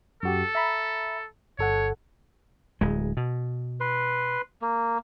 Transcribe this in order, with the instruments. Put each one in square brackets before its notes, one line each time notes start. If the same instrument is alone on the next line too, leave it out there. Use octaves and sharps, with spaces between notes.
[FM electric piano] F#2 F#4 G4 [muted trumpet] A4
[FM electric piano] E5 A#5 B5
[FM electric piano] G1 A4 F#5 [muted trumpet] C#5
[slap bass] D1 G#3
B2
[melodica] B4 C6
A#3